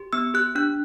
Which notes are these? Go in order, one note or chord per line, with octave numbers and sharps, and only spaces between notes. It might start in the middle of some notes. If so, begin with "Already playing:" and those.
Already playing: G4
B3 E6
G4 F#6
D4 F#6